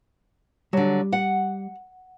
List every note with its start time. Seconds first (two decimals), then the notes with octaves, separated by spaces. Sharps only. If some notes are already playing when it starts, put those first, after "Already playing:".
0.73 D3 F#3 G3
1.13 F#5